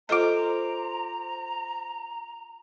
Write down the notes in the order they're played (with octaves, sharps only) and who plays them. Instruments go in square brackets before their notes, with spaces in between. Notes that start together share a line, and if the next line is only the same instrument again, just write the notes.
[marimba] F4 A4 D#5 [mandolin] C5 D6 [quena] A#5